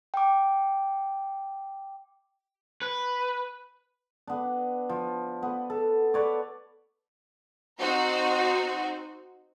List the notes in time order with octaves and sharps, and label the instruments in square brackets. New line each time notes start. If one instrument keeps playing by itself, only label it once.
[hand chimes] G5 D6
[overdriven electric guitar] B4
[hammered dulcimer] B3 D4
F3
B3
A4
B4 C#5 D5
[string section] C4 D#4 F#4 C5